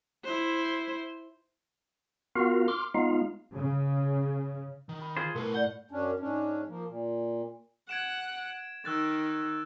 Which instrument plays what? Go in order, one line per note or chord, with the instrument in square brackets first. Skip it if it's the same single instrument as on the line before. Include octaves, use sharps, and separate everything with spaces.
[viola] E4 C5
[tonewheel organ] B3 F4 F#4 A#4 F5
C6 D6 F6
G#3 B3 D#4 F4 F5
[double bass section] C#3
[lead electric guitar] D#3
[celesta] B5
[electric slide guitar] F4 G#4 C5
[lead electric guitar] B1 B4 [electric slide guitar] A2 [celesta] A#4
[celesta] D5 G6 G7 [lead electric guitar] F#5
[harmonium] F#2 C#4 D4
G#2 C#4 D4
F3 A#3
A#2
[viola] F#5 [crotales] G#6 D7 E7
[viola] D#3 [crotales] E6 F#6 A6